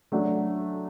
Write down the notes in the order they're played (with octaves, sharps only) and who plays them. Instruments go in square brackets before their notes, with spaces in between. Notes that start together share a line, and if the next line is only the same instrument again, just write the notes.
[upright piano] F#3 A3 D4